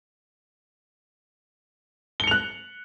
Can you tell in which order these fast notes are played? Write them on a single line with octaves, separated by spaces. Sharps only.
G7 C#7 F7 F#6